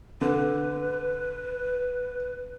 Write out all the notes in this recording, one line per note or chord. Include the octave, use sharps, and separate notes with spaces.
D3 B4